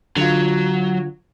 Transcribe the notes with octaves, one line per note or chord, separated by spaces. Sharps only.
D3 F#3 F4